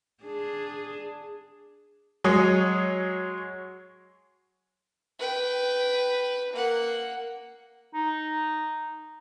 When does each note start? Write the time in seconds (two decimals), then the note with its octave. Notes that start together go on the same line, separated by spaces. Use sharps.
0.24 D4 G#4
2.24 F#3 G#3 C#5 D#6
5.19 B4 G5
6.54 A#3 F#5
7.94 D#4